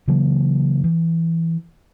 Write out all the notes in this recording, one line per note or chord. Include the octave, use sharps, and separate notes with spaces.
C#3 E3 F#3 A#3
E3